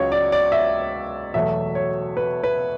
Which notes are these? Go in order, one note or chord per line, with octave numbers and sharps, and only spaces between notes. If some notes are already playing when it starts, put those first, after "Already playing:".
Already playing: C#2 C#3 F#3 C#5
D5
D5
E5
E2 B2 F#3 A3 E5
C#5
B4
B4